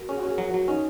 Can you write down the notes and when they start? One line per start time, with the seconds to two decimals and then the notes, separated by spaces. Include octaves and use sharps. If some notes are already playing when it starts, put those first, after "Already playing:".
Already playing: F#4 A#4
0.09 C#4 G#4
0.17 F#4
0.23 C#4 G#4
0.38 F#3 F#4
0.54 F#3
0.68 C#4 D#4